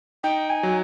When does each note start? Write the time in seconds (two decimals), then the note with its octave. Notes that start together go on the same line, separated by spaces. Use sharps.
0.24 D#4 G5
0.50 G#5
0.63 F#3